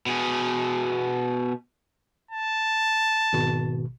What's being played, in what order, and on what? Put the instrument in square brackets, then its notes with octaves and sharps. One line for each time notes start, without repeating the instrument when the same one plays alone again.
[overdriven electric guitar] B2 G#4
[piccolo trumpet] A5
[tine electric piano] G#1 B2